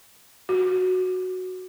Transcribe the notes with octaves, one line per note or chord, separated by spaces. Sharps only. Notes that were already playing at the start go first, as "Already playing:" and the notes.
F#4